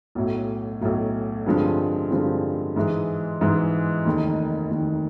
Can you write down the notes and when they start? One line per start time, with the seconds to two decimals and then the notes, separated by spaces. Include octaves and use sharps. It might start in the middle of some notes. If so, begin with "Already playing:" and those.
0.15 B1 A2 F#3
0.81 B1 A2 F#3
1.46 G2 D3 F3 G#3 C4
2.10 G2 D3 F3 G#3 C4
2.76 G#2 E3 G#3
3.41 G#2 E3 G#3
4.05 F1 D#2 D#3
4.71 F1 D#2 D#3